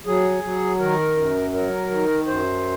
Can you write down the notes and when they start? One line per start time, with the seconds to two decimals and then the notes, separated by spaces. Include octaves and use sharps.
0.06 F#3 G#4
0.43 F#3
0.80 D#3 A#4
1.17 F#2
1.53 F#3 A#4
1.90 D#3
2.27 F#2 C5